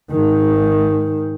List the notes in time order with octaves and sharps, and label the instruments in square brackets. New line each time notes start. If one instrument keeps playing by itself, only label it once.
[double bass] G#2 D#3